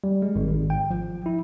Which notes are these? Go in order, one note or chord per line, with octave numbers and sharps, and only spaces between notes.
G3
G#3
G#1
G#1
G5
F3
E4